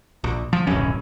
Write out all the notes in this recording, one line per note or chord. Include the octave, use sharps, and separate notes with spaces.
A#1
F3
D1 B1 F#2 C#4